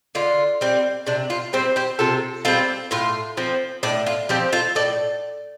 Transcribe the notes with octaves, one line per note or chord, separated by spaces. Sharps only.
D3 F4
G3 C4
C3 D4
F4
G3 C4 G4 C5
G4 C5
C3 F4 A4
G3 C4 F4 A4
A2 F4
F3 C4
A2 D4
F4
F3 C4 D4 G4
F4 A4
A2 A4 D5